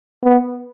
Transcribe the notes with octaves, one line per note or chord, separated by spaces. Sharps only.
B3